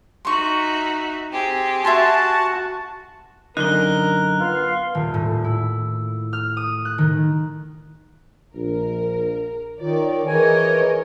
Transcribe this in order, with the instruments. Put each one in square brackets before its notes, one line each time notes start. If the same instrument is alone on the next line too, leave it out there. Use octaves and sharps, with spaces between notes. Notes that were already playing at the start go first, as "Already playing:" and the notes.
[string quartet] D#4 F#4 E5 [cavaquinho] C6 C#6
[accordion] C4 [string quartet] G4 G#4
[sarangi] F#4 [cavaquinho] E5 G#5 C6 [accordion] A5
[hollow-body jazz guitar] F#2 D3 D#4 [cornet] A#4 [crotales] F#6 G7
[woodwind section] B3 F4 F5
[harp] D#1
A2
E4
F6
D#6
F#6
D#3
[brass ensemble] A#1 [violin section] A#4
[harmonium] D#3 [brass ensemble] F4 A#4 C#5 [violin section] D5
[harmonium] E3 G#5 [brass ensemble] G#4 B4 [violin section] A#4 C#5 D#5